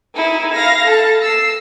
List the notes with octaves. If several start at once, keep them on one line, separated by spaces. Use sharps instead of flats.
D#4 E4
F5 A#6
A4 A5
E6 C7